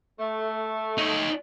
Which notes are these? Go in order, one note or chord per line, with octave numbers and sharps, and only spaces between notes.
A3
D#4 C#5